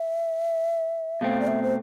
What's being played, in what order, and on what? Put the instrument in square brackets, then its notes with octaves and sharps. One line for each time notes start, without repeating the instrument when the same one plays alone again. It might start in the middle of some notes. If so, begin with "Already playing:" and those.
Already playing: [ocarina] E5
[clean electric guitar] B2 A3 C4 [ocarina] F5
[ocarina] D5
E5
C5